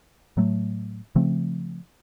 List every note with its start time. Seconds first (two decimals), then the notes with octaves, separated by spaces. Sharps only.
0.37 A2 F#3 A3
1.15 C#3 F3 A3 C4